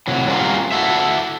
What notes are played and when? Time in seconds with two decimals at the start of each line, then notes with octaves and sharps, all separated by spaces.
0.07 A2 C3 F#3
0.28 F#3 G3 A#3 C#4 F4
0.72 E4 F#4 A4 E5